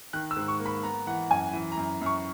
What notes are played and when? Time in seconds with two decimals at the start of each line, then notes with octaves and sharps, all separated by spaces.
0.13 D#3 F#6
0.31 E6
0.37 G#2
0.48 C#6
0.60 A#3
0.66 B5
0.83 B3 A#5
1.07 E3 F#5
1.31 F#2 G#5
1.53 E3
1.72 A#5
1.77 F#2
2.01 F#2 C#6